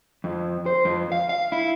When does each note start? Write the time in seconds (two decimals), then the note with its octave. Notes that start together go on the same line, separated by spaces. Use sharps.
0.24 F2
0.66 C5
0.85 F2
1.12 F5
1.29 F5
1.52 E4